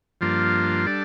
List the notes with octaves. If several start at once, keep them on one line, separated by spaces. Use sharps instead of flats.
G2 F3 A#3 D4 F4
G3 D4 A4 D5